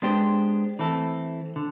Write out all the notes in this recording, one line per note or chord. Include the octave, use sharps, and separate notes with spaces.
G#3 B3 D4 G4 C5
E3 A3 C4 E4 A4
D3